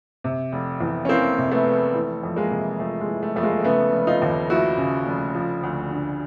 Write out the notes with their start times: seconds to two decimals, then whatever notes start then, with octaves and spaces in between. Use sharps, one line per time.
0.24 C3
0.52 F1
0.81 E2
1.05 C#4
1.09 E3 A#3 C4
1.38 C3
1.51 A3 B3
1.66 F1
1.94 E3 A3
2.23 F2
2.36 G#3 A#3
2.51 C3
2.80 F2 A3
3.01 G#3
3.08 E3
3.23 A3
3.36 F2 A3
3.43 G#3 A#3
3.60 A#3
3.64 C#3 A3 B3
3.92 F1
4.07 D#4 F4
4.22 D#2
4.50 F3 E4 F#4
4.78 C#3
5.06 F1
5.35 F3
5.63 D2
5.91 D3